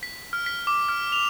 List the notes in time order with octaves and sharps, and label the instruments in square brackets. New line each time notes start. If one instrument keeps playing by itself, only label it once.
[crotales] B6
F6
B6
D6
F6
F7